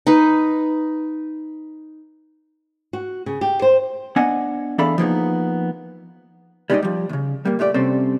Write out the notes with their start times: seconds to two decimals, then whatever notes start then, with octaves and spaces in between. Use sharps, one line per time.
0.07 D#4 B4
2.93 F#4
3.26 C#3
3.41 G4
3.62 C5
4.16 B3 D4 D#5 F#5 G#5
4.78 E2 D4 A4 D5 F5 B5
4.98 F3 G3 A#3 B3 D#4 G#4
6.70 G3 G#3 B3 D#4 D5 D#5
6.82 F3 G3
7.09 D2 C#3
7.45 G3 A#3
7.59 A#2 A3 G4 D5
7.74 C3 G3 C4 C#4 A4 C5